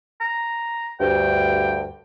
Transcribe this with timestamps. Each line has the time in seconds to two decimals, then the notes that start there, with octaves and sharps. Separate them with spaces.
0.21 A#5
1.00 D2 G2 G5